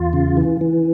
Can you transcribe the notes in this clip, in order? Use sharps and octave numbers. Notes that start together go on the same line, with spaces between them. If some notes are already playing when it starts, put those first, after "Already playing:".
Already playing: E2 F4
C#3
E3
E3